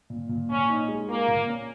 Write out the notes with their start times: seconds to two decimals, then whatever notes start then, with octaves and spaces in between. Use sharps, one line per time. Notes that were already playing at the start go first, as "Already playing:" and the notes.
0.10 A#2
0.29 A#2
0.49 A#2 C#4
0.69 D#4
0.88 G#3
1.08 A#3 F4
1.28 A#2
1.47 C#4